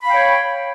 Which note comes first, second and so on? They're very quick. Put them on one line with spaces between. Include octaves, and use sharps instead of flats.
B5 F5 G5 C#5